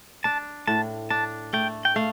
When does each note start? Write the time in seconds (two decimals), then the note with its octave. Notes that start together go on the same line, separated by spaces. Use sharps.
0.24 D4 A5
0.67 A2 A5
1.10 D4 A5
1.53 A3 G5
1.85 G5
1.96 A3 F5